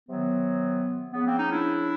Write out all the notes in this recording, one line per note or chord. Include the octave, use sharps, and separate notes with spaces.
C3 D#3 F#3 B3
C#3 F3 B3
A#3 C4
C#4 D#4
D4 E4